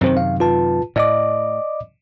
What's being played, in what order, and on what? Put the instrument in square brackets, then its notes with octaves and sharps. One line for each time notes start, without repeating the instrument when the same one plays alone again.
[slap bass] F#2 C3 D#3 [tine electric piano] C4 C5
[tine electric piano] F5
F4 B4 A5
[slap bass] A2 [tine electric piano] D5 D#5 D6